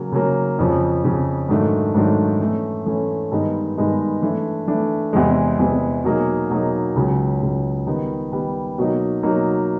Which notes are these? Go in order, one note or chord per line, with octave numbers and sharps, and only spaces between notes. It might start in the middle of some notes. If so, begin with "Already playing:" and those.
Already playing: C#3 F#3 A#3
C#3 F#3 A#3
F2 C#3 F3
F2 C#3 F3
G#2 D#3 F#3 A3 D4
G#2 D#3 F#3 A3 D4
E3 A3 C#4
E3 A3 C#4
G2 D#3 G#3 B3 D#4
G2 D#3 G#3 B3 D#4
E3 A3 D4
E3 A3 D4
E2 C3 E3 G#3
E2 C3 E3 G#3
B2 F#3 A#3 D#4 G#4
B2 F#3 A#3 D#4 G#4
C#2 C#3 F#3
C#2 C#3 F#3
D#3 G3 B3
D#3 G3 B3
B2 F#3 A#3 D#4
B2 F#3 A#3 D#4